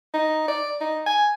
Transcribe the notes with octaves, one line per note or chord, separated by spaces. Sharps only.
D#4
D5
D#4
G#5